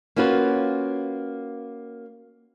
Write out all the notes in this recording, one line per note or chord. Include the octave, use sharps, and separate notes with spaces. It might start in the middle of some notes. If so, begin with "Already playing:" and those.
A#3 C#4 F4 F#4 B4